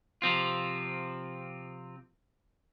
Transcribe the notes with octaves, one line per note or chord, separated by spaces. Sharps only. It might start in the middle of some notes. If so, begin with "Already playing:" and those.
C3 F3 C4 F4